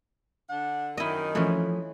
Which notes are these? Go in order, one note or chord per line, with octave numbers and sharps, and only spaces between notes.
D3 D4 F#5
F#2 D#3 E4 D#5
E3 F3 A3 C#4